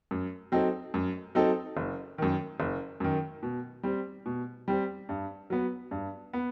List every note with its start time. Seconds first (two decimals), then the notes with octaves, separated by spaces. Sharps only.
0.11 F#2
0.52 F#3 C4 D#4 A4
0.94 F#2
1.35 F#3 C4 D#4 A4
1.77 F#1
2.18 F#2 D#3
2.60 F#1
3.00 F#2 D#3
3.43 B2
3.83 G3 C4
4.26 B2
4.68 G3 C4
5.09 G2
5.50 F#3 B3
5.91 G2
6.33 B3